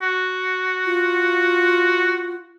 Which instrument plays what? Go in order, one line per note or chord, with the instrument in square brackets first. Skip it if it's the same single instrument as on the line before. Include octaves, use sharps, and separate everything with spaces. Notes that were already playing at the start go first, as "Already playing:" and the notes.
[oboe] F#4
[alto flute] F4